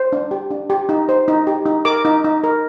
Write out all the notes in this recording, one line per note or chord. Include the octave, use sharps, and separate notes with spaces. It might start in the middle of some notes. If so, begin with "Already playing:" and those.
Already playing: C5
D4
G4
D4
G4
D#4
C5
D#4
G4
D#4
A#4 D6
D#4
D#4
A#4